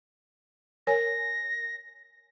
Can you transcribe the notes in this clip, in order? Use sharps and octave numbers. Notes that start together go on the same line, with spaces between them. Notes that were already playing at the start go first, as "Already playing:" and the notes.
A#4 C#5 G#5 A#6